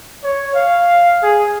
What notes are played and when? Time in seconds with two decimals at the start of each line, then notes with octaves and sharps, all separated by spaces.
0.24 C#5
0.55 F5
1.23 G#4